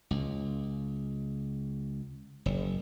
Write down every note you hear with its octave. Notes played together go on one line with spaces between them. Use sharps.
C#2
F#1